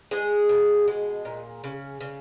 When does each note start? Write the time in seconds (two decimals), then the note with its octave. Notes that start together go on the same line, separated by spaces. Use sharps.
0.11 G#3 G#4
0.49 B2
0.87 G#3
1.25 A#2
1.64 C#3
2.01 C#3